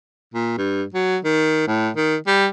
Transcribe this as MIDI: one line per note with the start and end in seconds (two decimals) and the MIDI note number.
0.34 0.55 46
0.58 0.84 43
0.94 1.18 54
1.25 1.67 51
1.67 1.90 45
1.96 2.16 51
2.27 2.47 55